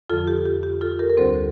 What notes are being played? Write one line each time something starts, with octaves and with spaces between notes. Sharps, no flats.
F2 D3 F3 F4 A4
G4
G4
G4
F4 A4
G4 A#4
A#4
D2 D3 G3 C4 A4 C5